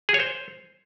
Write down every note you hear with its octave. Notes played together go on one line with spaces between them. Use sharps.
G#4
C#5
C5